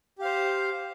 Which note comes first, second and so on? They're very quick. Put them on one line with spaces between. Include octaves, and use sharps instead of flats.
G4 F5 C5